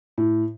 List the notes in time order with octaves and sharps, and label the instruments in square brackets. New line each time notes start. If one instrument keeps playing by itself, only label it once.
[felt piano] A2